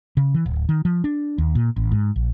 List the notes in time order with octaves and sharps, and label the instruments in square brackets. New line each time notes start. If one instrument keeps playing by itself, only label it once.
[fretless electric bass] C#3
E3
D1
D#3
F3
D4
D#2
A#2
A1
G#2
A#1